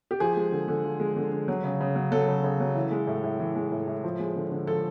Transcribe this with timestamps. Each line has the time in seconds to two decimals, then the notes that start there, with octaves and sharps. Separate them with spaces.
0.11 G4
0.20 F3 G#4
0.37 G#3
0.52 D3
0.68 D3
0.84 F3
1.00 G#3
1.16 D3
1.32 D3
1.48 F#3
1.64 C#3
1.81 C#3
1.96 F#3
2.12 F#3 A4
2.28 C#3
2.44 C#3
2.60 F#3
2.75 E3
2.91 G#3
3.07 A2
3.24 A2
3.40 E3
3.56 G#3
3.72 A2
3.87 A2
4.04 F3
4.19 G#3
4.36 D3
4.52 D3
4.67 F3 A4